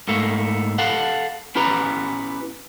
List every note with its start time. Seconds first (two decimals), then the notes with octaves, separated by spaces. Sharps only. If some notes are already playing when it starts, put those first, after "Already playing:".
0.08 G#2 A3 A#3
0.78 A4 F5 F#5
1.55 B3 C#4 E4 G4 B4 A#5